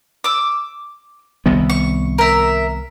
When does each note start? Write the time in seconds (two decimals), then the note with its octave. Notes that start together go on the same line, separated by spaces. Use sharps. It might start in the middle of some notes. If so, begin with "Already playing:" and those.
0.24 D6 E6
1.46 C2 D#3 B3
1.70 C#6
2.18 A#4 E5